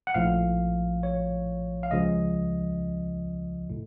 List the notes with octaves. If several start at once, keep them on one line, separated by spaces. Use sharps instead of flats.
F#5
A#1 A2 F3 F5
C#5
F5
C#2 C#3 F3 D#5
A2